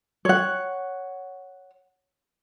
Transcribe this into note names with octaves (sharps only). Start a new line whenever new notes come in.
C#5 F#5